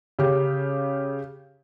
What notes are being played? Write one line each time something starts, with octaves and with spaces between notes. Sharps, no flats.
C#3 G4